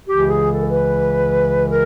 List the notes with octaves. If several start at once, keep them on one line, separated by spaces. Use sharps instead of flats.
C#2 C#3 E3 G4
G#4
A4
A#4
B4
A#4